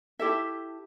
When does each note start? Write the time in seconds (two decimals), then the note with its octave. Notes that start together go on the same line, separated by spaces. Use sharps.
0.19 E4 G4 A4 E5